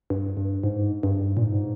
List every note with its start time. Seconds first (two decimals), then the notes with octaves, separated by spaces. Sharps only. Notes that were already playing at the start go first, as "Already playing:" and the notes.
0.10 G2
0.37 G2
0.63 G#2
1.03 G2
1.37 A#2
1.44 G#2